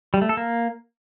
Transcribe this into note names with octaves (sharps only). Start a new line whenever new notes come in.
G3
A3
A4
A#3